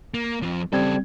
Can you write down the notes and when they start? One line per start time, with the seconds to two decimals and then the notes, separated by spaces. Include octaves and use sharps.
0.14 A#3
0.42 F2 F3
0.73 C#3 G3 C4 A4 G#6